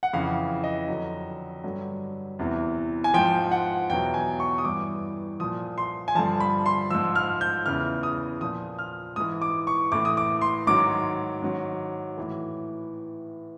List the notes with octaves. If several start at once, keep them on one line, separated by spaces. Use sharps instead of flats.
F#5
F2 C#3 E3 F5
D#5
F2 D3 F#3
G2 D3 F#3
E2 C3 E3
G#5
G#2 F3 G5
F#5
E2 B2 F#3 G5
G#5
C#6
D#6
G2 E3 D6
A#2 F3 D#6
C6
G#5
G2 D3 F3 A5
B5
C6
G#2 F3 E6
F6
G6
E2 C#3 E3 F6
D#6
A#2 F3 D#6
F6
G#2 E3 D#6
D6
C#6
A2 E3 D6
D#6
D6
C6
G#2 D#3 F#3 D6
G#2 D#3 F#3
A2 E3